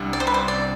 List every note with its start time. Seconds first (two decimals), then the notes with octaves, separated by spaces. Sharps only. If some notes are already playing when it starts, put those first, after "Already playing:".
Already playing: C2 C3 G3 D4
0.13 D5
0.20 C5
0.27 B4
0.34 C5
0.48 D5